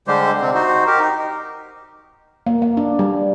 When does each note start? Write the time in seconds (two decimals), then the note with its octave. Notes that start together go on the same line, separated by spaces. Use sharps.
0.08 D3 G3 G#3 G4 C5
0.41 C3 C4
0.54 D#4 F#4 C5
0.87 G4 A#4
1.00 D#4
2.47 A#3
2.62 A#3
2.77 D4
2.99 G3